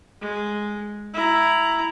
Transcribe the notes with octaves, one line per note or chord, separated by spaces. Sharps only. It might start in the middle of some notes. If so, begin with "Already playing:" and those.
G#3
E4 A#5